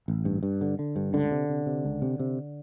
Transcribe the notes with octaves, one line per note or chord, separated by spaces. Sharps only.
A1
G2
G2
D3
D3
G2
C#2 D3
C3
C3
C3
C#2
C3
C3